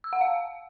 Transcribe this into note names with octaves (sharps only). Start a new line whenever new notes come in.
E6
F#5
F5